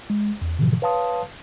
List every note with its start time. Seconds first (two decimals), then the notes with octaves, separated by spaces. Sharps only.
0.10 G#3
0.42 E2
0.59 G#2 B2 D3 E3 F3
0.82 B4 C#5 F5 A5 C6 D#6